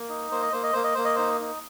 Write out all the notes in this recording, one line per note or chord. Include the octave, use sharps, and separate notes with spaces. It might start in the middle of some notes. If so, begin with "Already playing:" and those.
Already playing: A#3
D#4
A#3 C5
D#5
A#3 C5
D#5
A#3 C5
D#5
A#3 C5
D#5
D#4 C5
D#4